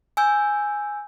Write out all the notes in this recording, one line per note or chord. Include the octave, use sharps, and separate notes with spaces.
G#5 E6 G6